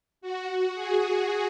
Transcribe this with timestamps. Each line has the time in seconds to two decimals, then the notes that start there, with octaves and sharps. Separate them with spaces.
0.21 F#4
0.75 G#4